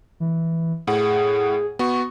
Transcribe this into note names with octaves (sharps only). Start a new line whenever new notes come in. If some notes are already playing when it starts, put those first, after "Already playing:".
E3
A2 G#4 F#5
B3 F#4 C#6